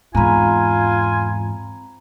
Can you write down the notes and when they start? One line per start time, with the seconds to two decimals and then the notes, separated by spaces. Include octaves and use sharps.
0.15 E2 G#2 C4 F4 G#5 A#5 B5